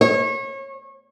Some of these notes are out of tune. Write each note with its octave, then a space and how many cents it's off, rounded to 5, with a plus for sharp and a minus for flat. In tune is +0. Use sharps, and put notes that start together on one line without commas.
C#5 -30